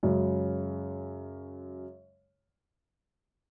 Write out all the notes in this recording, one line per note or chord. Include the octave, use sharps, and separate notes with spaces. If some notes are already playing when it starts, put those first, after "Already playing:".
F#2 C#3 G#3